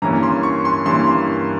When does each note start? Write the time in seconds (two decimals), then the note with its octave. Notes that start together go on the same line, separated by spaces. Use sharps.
0.02 G2 E3 A#3 C#4 A#5
0.23 C6
0.43 C#6
0.65 C6
0.86 G2 E3 A#3 C#4 C6
1.07 C6